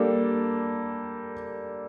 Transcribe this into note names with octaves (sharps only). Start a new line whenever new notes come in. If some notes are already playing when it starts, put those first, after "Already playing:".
Already playing: G3 A#3 D4 A4